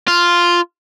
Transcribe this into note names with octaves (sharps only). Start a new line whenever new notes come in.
F4